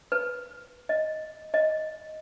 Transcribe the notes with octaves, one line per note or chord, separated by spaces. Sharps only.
B4
D#5
D#5